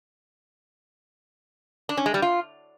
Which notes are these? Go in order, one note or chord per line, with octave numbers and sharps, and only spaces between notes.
D4
C#4
G#3
G3
F4